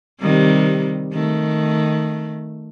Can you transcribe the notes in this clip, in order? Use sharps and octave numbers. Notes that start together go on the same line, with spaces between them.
C3 D#3 G3
D#3 A3